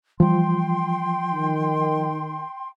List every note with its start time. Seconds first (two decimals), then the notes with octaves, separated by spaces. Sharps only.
0.20 E3 F3 G3 G5 C6
1.33 D#3